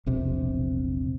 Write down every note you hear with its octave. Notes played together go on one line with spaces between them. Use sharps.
E1 A#1 C3